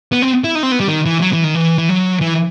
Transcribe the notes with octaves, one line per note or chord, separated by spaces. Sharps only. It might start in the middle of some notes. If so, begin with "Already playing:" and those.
B3
C4
E4
D#4
C4
B3
G3
D#3
E3
F#3
E3
D#3
E3
E3
F#3
E3